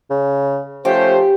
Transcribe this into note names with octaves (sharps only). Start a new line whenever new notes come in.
C#3
F3 A3 C#4 G4 C5